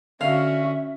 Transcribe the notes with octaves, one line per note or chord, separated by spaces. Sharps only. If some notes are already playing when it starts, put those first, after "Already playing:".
D3 C#4 F#4 E5 F5